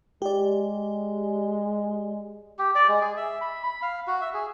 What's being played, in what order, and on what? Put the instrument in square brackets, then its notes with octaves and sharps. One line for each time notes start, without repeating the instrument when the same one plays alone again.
[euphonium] G#3 [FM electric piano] G4 D5
[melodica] G4
D5
G#3
G#4
E5
B5
B5
F5
F#4
E5
G#4